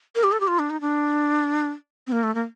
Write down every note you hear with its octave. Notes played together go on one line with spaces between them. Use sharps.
A#4
G4
A4
G4
F4
D4
D#4
D4
C4
A#3
A3
A#3